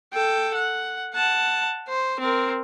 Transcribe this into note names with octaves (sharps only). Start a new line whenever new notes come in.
A4 G5
F#5
F#5 A5
C5
C4 A#4